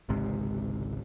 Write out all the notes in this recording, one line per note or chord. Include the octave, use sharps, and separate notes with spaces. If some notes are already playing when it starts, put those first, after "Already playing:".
G#1 C#2 G#2 C3